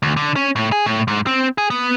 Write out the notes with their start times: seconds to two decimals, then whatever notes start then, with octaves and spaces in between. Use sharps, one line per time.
0.03 D2
0.17 D3
0.36 C#4
0.56 A2
0.72 G#4
0.86 A2
1.08 G#2
1.27 C4
1.58 G#4
1.70 B3